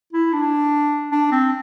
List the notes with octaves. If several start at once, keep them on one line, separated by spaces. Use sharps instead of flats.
E4
D4
D4
C4